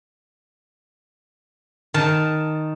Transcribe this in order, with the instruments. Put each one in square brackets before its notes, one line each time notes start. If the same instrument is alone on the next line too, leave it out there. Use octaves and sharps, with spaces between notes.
[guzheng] D#3 A5